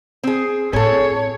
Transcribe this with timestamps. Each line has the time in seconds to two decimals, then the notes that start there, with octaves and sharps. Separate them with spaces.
0.23 C4 G#4
0.73 A2 C4 G#4 A4 C#5